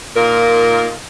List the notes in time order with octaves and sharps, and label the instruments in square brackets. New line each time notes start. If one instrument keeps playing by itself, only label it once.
[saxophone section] A#2 D#4 F4 A#4